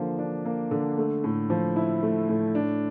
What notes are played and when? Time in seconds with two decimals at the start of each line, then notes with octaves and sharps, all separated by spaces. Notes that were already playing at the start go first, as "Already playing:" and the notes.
Already playing: D3 F3 A#3
0.19 D4
0.45 A#3
0.71 D3
0.98 A3
1.24 A2
1.50 F3
1.76 E4
2.03 A3
2.29 A2
2.55 D4